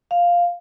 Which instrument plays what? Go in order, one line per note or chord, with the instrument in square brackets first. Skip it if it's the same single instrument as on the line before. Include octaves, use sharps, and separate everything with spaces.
[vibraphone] F5